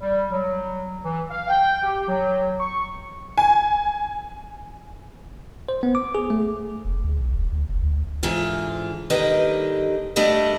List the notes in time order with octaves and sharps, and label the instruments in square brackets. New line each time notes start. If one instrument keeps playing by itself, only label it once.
[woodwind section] G3
F#3
E3
F5
G5
G4
F#3
C#6
[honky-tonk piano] G#5
[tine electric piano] C5
B3
D6
G#4
A3
[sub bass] F1
D2
B1
D#1
D2
F1
D2
[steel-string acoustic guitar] G#2 D3 E3 F4
D#2 D3 D#3 G3 B4 D#5
G3 A3 D4 F#4 D#5